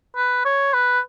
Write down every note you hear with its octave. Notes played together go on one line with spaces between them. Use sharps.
B4
C#5
B4